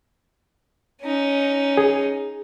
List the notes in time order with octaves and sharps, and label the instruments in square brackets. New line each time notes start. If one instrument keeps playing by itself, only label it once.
[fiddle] C#4 D#4
[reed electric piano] G#4